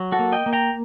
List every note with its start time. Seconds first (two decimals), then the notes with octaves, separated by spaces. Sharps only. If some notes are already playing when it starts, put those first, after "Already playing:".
Already playing: F#3
0.12 F#4 A4
0.19 A#3
0.32 D#5 G5
0.46 A#3
0.53 G5 A#5